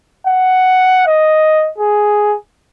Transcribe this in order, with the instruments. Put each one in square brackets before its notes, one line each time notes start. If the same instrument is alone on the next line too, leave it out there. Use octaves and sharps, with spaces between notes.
[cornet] F#5
D#5
G#4